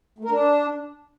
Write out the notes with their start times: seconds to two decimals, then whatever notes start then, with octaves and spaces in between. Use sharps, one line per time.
0.19 A3
0.25 A#4
0.31 D4